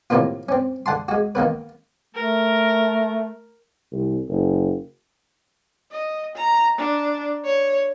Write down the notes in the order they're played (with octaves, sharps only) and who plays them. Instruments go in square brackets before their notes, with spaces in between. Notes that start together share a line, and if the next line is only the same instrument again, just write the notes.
[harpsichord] A2 C3 D#3 A#3 B3 F4
C4 C#4
D3 F#5 A5 C6
G#3 F#4
D#3 A#3 B3 B4
[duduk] A3 [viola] A#4
[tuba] C2
F#1
[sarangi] D#5
A#5
D4
C#5